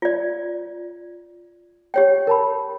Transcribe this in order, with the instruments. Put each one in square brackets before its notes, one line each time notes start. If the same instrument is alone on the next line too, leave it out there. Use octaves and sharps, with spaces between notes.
[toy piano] F4 D5
G4 C#5 G5
[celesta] A#4 A5 B5